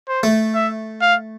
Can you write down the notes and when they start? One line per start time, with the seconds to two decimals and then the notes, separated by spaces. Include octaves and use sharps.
0.08 C5
0.23 A3
0.55 E5
1.01 F5